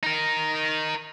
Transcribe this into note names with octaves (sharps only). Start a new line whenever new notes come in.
D#4 A#4